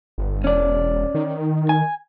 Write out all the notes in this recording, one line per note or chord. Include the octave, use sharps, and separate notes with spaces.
G1
E1 C#4 D5
D#3
G#5